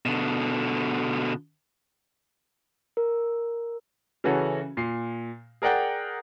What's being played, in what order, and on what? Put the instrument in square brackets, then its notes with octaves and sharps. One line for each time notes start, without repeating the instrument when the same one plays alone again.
[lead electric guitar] B2 D3
[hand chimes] A#4
[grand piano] C#3 E3 C#4 F#4 A4
A#2 C7
G#4 A#4 D5 F#5 G5